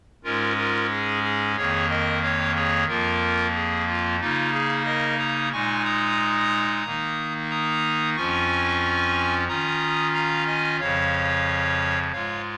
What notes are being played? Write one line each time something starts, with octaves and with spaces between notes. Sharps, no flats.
G#2 G#3 C#4 F4 A#4
F4 A#4
G#4
G#4
F2 D#3 A#3 G#4 C#5
A#4 D#5
C#5 F5
G#4 C#5
F2 F3 A#3 F4 A#4
G#4
F4
C#3 A#3 D#4 F4
G#4
A#4 D#5
A#5 D#6
A#2 G#3 D#4 G#5 C#6
A#5 D#6
D#3 A#3 D#4
A#5 D#6
F2 F3 C#4 F4 G#5 C#6
D#3 C#4 F4 A#5 D#6
F5 A#5
D#5 G#5
F2 C#3 F3 C#5 F5
G#2 G#3 F4 C#5 F5